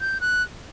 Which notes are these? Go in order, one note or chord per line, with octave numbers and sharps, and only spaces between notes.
G6
F#6